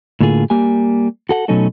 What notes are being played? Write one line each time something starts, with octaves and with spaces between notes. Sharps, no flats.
A2 D3 A#3 F4 G#4
G3 A#3 G4 G#5
F#4 A4 F#5
B2 F#3 A3 C#4 D#4 A4